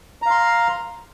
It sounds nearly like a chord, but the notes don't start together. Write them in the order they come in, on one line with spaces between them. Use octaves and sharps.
A#5 F5 C6